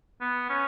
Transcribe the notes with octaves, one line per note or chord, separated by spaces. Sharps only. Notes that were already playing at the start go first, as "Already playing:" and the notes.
B3
C#4